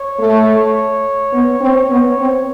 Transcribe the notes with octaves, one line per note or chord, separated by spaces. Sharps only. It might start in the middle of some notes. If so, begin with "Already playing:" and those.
Already playing: C#5
A3
B3
C4
B3
C4